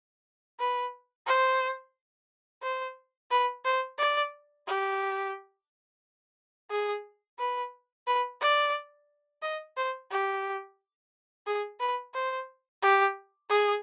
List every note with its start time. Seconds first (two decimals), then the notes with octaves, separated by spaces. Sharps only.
0.60 B4
1.27 C5
2.63 C5
3.31 B4
3.65 C5
3.98 D5
4.67 G4
6.70 G#4
7.39 B4
8.07 B4
8.41 D5
9.43 D#5
9.77 C5
10.11 G4
11.47 G#4
11.80 B4
12.14 C5
12.82 G4
13.50 G#4